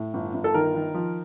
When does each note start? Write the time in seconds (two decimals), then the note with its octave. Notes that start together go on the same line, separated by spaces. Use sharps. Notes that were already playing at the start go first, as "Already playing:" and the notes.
Already playing: A2
0.14 G1
0.34 G1
0.44 A4
0.54 D#3 A#4
0.75 D#3
0.94 F3